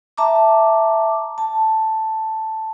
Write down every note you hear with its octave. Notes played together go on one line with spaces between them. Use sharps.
E5 A5 A#5 D6
A5